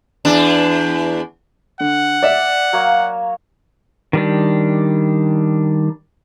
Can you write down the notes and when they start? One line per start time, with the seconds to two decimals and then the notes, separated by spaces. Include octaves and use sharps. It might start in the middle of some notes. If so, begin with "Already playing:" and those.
0.25 E2 D4
1.80 D3 F#5
2.23 D5 E5
2.73 F#3 A#3 C#5
4.13 D#3 G3 D4